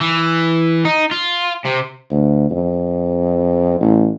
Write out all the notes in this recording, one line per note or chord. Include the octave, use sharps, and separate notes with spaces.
E3
D#4
F4
C3
D2
F2
A1